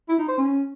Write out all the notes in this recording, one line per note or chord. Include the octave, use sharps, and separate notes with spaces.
E4
D#4
C5
C#4